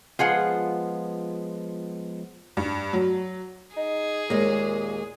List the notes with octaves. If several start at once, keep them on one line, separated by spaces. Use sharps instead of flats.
F3 G#3 B3 F4 G#4 F#5
G2
F#3
D#4 G#4
D#2 A#2 G#3 A#3